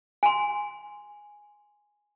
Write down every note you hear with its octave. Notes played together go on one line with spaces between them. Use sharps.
G#5 C6